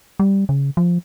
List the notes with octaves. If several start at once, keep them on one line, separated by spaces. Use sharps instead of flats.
G3
C#3
F3